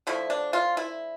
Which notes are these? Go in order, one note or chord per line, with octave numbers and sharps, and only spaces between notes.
D3 F3 A3 E4
D4
F4
E4